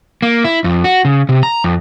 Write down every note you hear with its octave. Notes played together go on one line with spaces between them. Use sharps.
A#3
E4
F2
F#4
C#3
C3
A#5
F2